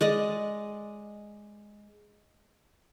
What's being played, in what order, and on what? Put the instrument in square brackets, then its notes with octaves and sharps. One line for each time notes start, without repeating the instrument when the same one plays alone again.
[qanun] G#3 D5 D#5